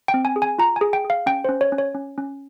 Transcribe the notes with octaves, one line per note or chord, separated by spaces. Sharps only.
G5
C4
G#5
G#4
G#5
F4 A#5
G#4 G#5
G5
G#4
F5
C#4 G5
C#4 C5
C#5
C#4
C#5
C#4
C#4